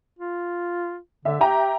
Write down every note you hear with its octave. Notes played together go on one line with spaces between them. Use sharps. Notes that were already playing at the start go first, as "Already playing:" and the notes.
F4
D3 E5
G4 E5 G5 A#5